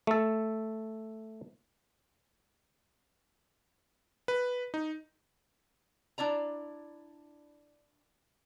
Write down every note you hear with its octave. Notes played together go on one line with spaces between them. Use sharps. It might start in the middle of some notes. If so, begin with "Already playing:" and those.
A3 A4
B4
D#4
D4 E4 D5 A#5